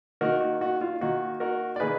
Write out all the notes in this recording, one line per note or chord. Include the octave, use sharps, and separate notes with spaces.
D#3 A#3 D#4 F#4 A#4
F#4
F#4
F4
D#3 A#3 D#4 F#4
F#4 A#4
D5
D#3 A#3 D#4 G#4 B4